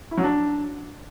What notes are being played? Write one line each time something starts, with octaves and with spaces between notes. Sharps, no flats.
E4
F#3
D4